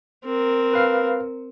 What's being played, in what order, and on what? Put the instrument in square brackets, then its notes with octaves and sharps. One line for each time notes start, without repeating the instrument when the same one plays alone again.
[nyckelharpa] C4 A#4
[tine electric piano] B4 F5 F6